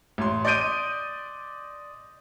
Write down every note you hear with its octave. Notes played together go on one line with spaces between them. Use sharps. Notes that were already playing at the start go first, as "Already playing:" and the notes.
A1 C6
D5 D#5 C6 G6 D7 D#7